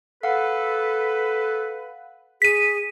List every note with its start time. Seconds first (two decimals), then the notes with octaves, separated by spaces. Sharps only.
0.23 A4 B4 F5 F#5
2.42 G#4 B6 D#7